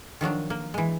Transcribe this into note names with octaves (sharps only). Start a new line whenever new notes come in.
D#3 F3 F#3 D4
A#3
E3 G#3